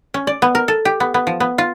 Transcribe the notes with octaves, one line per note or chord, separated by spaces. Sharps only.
C#4
D5
B3
A#4
A4
G4
B3
B3
F3
B3
F4